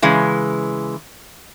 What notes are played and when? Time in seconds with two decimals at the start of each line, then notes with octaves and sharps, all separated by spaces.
0.02 C#3 E3 G#3